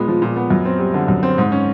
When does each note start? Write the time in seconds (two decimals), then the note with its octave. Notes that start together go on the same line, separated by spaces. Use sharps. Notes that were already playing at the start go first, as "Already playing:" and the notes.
Already playing: A#2 G#3 B3
0.08 F3
0.22 A#2
0.36 B3
0.50 F#2
0.65 C4
0.79 G3
0.94 D3
1.08 F#2
1.23 C4
1.38 G#2
1.52 C#4